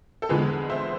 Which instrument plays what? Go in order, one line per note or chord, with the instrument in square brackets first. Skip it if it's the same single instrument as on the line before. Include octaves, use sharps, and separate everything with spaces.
[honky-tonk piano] A4
E2 D3 F3 G#3 G#4 B4
C5 E5